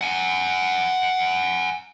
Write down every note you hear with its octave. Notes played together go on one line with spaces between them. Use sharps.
F#5 G#5